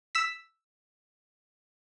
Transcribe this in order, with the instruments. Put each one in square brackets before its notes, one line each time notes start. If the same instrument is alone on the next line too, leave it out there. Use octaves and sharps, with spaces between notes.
[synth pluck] E6 B6